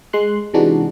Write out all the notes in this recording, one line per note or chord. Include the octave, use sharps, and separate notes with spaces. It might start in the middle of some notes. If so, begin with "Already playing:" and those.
G#3 C6 F#6
C3 E3 G#3 D4 D#4 F#4